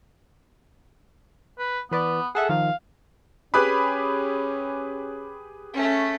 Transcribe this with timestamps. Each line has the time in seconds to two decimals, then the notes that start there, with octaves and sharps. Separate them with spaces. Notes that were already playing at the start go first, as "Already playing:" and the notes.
1.58 B4
1.91 E3 B3 B4 D5
2.35 G#4 A4 E5 F#5
2.49 D#3 F3 F5
3.54 C#4 G4 G#4 B4 B5 D6 F#6
5.74 A3 C#4